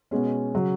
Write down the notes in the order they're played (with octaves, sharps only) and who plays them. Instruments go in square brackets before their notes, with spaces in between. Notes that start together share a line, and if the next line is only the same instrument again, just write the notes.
[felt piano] B2 G#3 C#4
C#3 F#3